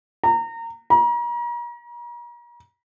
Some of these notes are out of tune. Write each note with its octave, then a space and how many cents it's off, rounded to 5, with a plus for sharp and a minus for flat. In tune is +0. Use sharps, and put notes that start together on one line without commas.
A#5 -25
A#5 +40